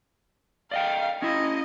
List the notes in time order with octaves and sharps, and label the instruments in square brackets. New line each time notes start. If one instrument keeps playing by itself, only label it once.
[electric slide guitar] D5 D#5 G5 [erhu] F5
[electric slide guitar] C#4 E4 [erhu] D#5